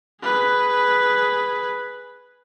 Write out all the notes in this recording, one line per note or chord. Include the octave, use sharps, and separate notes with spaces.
G#4 B4